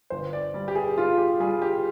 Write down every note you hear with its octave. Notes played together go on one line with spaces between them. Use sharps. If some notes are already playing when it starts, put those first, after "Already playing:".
G1 C5
D5
G3
G4
G#4
G3 F4
G4
G3 G#4
G4